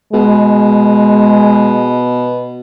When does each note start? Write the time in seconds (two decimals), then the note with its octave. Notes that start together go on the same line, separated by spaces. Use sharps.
0.13 B2 G#3